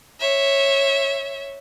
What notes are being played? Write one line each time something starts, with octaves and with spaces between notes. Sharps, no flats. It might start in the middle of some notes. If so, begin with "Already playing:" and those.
C#5 E5